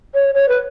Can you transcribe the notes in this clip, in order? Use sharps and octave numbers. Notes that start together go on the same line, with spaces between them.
C#5
C#5
B4